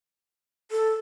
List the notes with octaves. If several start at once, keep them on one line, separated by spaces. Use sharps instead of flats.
A4